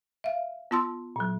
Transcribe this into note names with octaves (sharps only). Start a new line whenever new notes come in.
E5 F5
B3 F4 A5 C6 E6
A#2 F#3